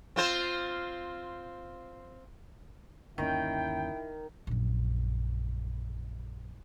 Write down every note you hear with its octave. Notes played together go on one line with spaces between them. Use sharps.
C4 F4 C5
G1 D#2 D#3 C#4 E4 G5
A#1 F#2